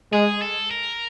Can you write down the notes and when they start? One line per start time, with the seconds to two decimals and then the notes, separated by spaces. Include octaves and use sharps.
0.13 G#3 G#4
0.42 A4
0.71 A#4